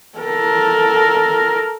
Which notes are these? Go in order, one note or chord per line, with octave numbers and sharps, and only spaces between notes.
A4 A#4